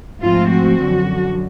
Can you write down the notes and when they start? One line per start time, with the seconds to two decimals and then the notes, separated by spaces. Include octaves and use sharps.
0.22 G#2 F3 A3 C4 F4
0.50 F#4
0.78 F#2 D3 F3